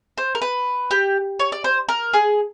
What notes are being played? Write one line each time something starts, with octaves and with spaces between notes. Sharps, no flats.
C5
A#4
B4
G4
C#5
D5
C5
A#4
G#4